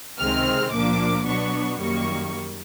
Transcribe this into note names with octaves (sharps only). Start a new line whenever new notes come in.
C#2 C3 D#3 G#3 C4 F6
A#2 F3 A#3 D4 D6
B2 F#3 B3 D4 C#6
F#2 D#3 G3 A#3 C#6